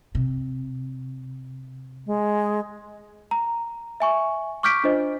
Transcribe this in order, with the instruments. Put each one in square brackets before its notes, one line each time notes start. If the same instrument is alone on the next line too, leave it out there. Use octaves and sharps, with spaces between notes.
[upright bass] C3
[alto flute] G#3
[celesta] A#5
E5 G#5 C#6
C#6 D6 F6 G6 B6 D7
D4 F4 C5 D#5